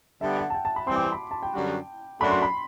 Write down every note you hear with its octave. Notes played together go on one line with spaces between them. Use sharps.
D3 G3 B3 E5
F#5
A5
G5
A5
B5
E3 G3 C4 C6
D6
C6
B5
A5
G5
F#2 D3 G3 D4 F#4
F#2 F#3 A3 D4 F#4 B5
C6
B5